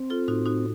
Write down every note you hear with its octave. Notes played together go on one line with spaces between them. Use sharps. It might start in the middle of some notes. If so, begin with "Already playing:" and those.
Already playing: C4
F4 A4
A2 D#4 F#4
D#4 F#4